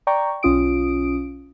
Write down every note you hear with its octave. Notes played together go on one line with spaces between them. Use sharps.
D5 G5 A#5 C#6
B1 C#4 F4 D#6 D7